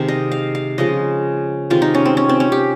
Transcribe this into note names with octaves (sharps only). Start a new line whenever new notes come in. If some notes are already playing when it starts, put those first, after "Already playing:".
Already playing: C3 D#3 G#3 F5
D#5
F5
F5
C#3 F3 G#3 D#5
C3 D#3 G#3 F4
D#4
C#4
C4
C#4
C4
C#4
G4